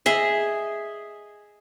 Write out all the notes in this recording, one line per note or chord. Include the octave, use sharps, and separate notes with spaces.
G#4 D#5 E5